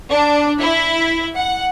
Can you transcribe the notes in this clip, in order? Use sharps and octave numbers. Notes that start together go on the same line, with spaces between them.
D4
E4
F#5